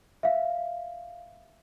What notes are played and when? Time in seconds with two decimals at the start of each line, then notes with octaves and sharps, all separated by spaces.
0.23 E5 F5